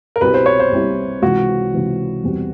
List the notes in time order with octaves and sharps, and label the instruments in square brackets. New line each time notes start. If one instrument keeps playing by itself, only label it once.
[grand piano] A#4
[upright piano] C2 B2 G3 C4 E4 [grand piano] B4
[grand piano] C5
C#5
C5
[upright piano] C2 B2 G3 C4 E4
[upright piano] C#2 C3 E3 [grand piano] F#4
[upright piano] C#2 C3 E3
E2 B2 G3 C4